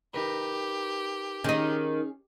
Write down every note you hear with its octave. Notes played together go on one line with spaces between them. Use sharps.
D#4 G4 A#4 B4
D#3 C#4 D#4 G#4